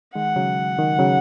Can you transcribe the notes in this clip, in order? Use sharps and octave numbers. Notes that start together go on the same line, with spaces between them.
D#3 G#3 F#5
C#3 F#3
D#3
C#3 F#3